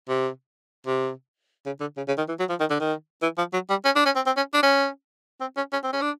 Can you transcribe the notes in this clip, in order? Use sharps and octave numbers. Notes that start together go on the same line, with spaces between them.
C3
C3
C#3
D3
C#3
C#3
D#3
E3
F#3
F3
D#3
D3
D#3
E3
F3
F#3
G3
C#4
D4
C#4
C4
C4
C#4
D4
C#4
C4
C#4
C#4
C4
C#4
D4